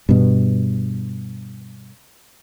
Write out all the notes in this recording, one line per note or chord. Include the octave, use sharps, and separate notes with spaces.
G2 B2